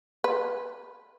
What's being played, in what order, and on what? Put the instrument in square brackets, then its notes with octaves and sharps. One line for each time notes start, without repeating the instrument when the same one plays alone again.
[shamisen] B4